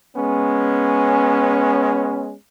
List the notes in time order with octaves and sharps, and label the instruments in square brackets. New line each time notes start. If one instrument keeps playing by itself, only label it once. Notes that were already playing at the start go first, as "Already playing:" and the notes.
[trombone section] G#3 B3 C#4